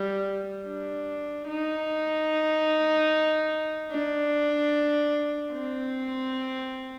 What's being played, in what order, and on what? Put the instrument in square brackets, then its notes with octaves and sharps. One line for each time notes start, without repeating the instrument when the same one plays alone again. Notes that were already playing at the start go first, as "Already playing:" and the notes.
Already playing: [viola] G3
D4
D#4
D4
C4